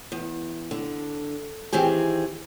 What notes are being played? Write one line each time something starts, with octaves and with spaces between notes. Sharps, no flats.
E2
D3
D#3 E3 C4 G4 G#4